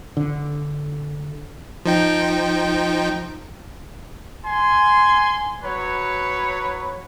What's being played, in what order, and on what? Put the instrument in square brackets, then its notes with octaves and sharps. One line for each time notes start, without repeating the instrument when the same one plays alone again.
[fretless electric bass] D3
[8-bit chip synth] F3 D#4 G5
[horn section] G#5 C6
F#3 B4 C#5